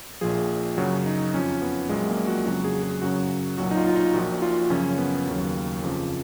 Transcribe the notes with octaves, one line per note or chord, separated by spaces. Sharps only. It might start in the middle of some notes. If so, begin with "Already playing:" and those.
A#1 A#2 F3 G#4
F#2 C#3 F#3 F#4
D#4
F2 F3 C#4
B3
A#1 A#2 F#3 G#3
A#3
F#4
F2 C#3 F#3 F#4
G#4
G#4
F#2 C#3 F#3 F#4
B1 A#2 F#3 F#4
D#4
F4
F4
D#4
A#1 A#2 F3 F#4
F4
F#2 C#3 F3 C#4
B3
D#2 C#3 F#3
F2 C#3 F3